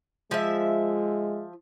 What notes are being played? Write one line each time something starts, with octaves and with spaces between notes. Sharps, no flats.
F3 G#3 E5